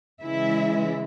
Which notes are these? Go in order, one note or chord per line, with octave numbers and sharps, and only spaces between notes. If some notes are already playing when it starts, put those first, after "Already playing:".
C#3 E3 G#3 E4 E5